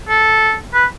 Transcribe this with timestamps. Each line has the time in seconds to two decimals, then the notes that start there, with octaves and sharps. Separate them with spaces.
0.08 A4
0.74 B4